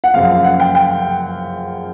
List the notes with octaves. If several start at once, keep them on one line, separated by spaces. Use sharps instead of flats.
F#5
F#2 C#3 F3 F5
F5
F#5
G5
G5